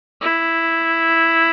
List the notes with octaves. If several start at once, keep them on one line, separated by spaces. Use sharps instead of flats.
E4